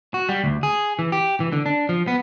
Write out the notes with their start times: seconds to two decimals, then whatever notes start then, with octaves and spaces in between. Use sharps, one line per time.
0.14 F#4
0.29 G3
0.44 D2
0.63 G#4
0.99 E3
1.12 G4
1.40 E3
1.52 D3
1.66 D4
1.89 F3
2.08 B3